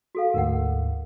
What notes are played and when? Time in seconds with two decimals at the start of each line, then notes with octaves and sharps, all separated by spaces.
0.15 F#4 A4 F5
0.34 D2 G#2 A#4 F#5